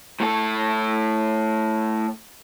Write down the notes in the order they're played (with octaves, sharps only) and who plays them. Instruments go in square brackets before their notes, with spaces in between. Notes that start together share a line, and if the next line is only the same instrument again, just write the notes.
[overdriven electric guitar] A2 A4